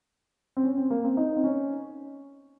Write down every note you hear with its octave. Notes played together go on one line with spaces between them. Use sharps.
C4
C#4
C4
A#3
C4
D#4
C4
C#4